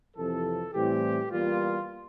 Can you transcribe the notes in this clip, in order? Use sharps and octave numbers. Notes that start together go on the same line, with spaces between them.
F2 C3 E3 A4
A2 E3 G3 C4 G4
E2 E3 G3 A#3 F4